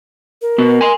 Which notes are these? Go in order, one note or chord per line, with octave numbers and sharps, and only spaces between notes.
A#4
B3 F#4
G#5 C6